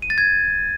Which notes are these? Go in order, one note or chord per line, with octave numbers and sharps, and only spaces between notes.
D#7
A6
G#6